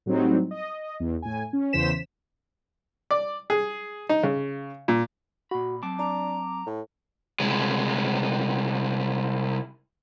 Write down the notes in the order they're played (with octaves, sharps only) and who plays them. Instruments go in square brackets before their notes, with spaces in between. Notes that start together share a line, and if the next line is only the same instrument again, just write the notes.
[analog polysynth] A2 F#3 G3 C4 D#4
D#5
E2
A2 G#5
C#4
E2 C#3 E3 C5 B6 E7
[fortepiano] D5
G#4
D#4
C#3
A#2
[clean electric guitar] A#2 B5 [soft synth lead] F#4
[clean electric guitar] F#3 C4 A5 [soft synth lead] D6
[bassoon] D4 [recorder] A#5
[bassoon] A2
[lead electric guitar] C2 G#3